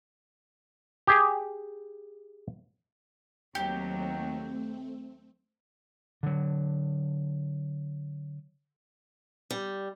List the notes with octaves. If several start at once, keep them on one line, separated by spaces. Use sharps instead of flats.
G4 G#4
D#2 F#3 A3 C4 G4
D3 F#3
G3